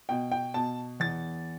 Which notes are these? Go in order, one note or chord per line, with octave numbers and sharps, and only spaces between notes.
B2 G5
G5
B2 A5
E2 A6